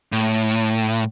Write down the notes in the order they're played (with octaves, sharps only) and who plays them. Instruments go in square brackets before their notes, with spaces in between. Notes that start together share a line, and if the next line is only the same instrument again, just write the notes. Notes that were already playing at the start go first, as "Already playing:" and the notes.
[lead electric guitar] A2